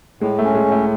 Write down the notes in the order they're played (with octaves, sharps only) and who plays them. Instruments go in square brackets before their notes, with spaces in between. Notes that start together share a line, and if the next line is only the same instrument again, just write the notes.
[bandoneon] A2 [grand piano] G#3
[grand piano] A3
[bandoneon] C#4
[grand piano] G#3
[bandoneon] A2
[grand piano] A3